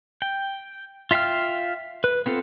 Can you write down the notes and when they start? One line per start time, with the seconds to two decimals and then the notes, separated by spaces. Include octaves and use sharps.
0.22 G5
1.11 F4 E5 F5 G5 F6
2.04 B4
2.26 B3 C4 F4 A4